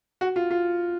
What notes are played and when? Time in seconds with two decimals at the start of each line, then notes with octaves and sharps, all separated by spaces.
0.21 F#4
0.36 F4
0.51 F4